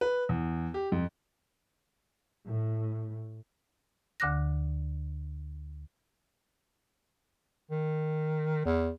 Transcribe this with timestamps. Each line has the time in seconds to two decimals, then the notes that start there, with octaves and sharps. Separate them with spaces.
0.01 B4
0.29 E2
0.74 G4
0.92 F2
2.45 A2
4.20 D2 D3 D6 F#6 A#6
7.71 D#3
8.65 E2